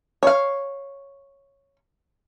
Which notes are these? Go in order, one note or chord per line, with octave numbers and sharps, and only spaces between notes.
C#5 F5